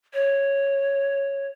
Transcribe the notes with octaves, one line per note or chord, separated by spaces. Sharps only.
C#5